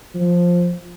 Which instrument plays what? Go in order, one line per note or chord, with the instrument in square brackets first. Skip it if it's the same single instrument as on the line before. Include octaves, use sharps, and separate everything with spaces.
[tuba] F3